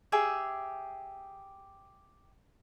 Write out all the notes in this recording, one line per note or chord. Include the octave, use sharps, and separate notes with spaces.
G4 G#4 E5